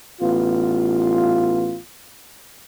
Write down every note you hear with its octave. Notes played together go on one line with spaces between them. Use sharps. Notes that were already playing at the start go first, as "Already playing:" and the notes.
A1 B3 F4